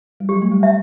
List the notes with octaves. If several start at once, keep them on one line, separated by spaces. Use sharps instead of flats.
G3
F#3 G4
A3
G3
E5